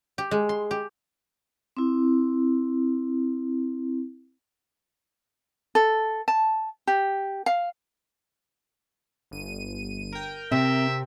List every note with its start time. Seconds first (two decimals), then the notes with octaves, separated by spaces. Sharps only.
0.18 G4
0.31 G#3
0.49 C6
0.71 G4
1.77 C4 E4
5.75 A4
6.28 A5
6.87 G4
7.46 F5
9.31 G1 D#7
10.12 A#4 G5
10.52 C3 C4 E5